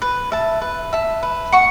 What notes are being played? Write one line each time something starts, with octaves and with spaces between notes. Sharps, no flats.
B4
E5 A5
B4
E5 A5
B4
F#5 C#6